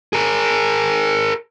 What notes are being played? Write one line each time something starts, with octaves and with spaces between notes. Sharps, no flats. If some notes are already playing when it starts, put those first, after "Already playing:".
G#4 A#4